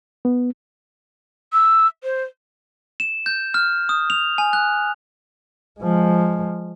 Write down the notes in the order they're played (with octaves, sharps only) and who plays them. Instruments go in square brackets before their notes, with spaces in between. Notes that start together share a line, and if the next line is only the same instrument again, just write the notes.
[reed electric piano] B3
[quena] E6
C5
[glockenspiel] E7
G6
F6
D#6
F7
G#5
F#6
[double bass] F3 G#3